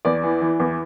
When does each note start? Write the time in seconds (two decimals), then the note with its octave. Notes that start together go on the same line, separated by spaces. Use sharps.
0.05 E2 D5
0.23 E3
0.41 E3
0.60 E2